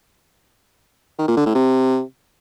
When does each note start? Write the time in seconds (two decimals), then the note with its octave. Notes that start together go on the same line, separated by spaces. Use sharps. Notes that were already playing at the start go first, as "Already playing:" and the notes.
1.19 D#3
1.28 A#2
1.37 D3
1.46 A2
1.55 C3